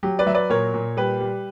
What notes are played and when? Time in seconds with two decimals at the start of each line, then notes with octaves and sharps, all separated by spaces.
0.03 F#3 G4
0.19 B4 D5
0.26 F#3 E5
0.34 B4 D5
0.49 A#2 A#4 C#5
0.74 A#2
0.97 G3 G4 B4
1.21 G3